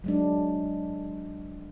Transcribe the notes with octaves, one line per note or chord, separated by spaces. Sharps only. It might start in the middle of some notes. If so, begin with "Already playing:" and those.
F#3 G#3 D4